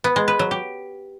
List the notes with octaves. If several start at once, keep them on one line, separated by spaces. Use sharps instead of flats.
B3
G#3
B4
F#3
G4